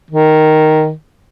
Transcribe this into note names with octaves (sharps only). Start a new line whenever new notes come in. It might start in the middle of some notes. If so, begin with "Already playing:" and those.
D#3